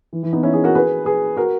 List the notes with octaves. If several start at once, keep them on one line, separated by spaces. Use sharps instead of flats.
E3
E3
B3 D#4
C#4 E4
E4 G#4
F#4 A#4
G#4 B4
G#4 B4
F#4 A#4